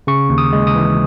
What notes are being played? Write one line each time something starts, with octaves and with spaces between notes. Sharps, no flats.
C#3 C#6
D#2
D#6
G#3
D#6
E3